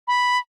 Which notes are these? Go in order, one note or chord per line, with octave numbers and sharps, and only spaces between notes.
B5